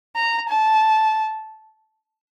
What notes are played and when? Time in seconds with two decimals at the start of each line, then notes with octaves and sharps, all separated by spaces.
0.16 A#5
0.49 A5